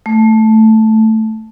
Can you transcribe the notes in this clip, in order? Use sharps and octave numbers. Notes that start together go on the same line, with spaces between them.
A3